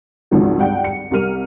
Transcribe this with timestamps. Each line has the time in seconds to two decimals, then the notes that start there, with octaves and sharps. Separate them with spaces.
0.31 G#1 C#2 G#2 D#3 F3 F#3
0.59 G2 F#5 G5
0.84 C#7
1.11 C2 G3 A#4 F6 D#7